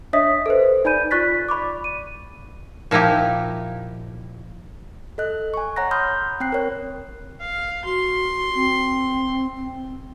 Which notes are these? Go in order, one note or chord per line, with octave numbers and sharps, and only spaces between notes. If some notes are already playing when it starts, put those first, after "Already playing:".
D4 C#5 D#5 E5 D#6 B6
A4 B4 C5
D#4 D5 G#5 B5 G6 D#7
F4 D5 C#6 F#6 A6 B6
D5 B5 C#6 D6
D#7
A#2 F3 D#4 E4 G4
A4 D#5 F#6
G#5 C#6
C#5 F#5 A#5 F#6 A#6
B5 C6 D#6 F6 G6
C4 G5 F#6 C7
A#4 C#5
F5
F#4 C6
C4
C4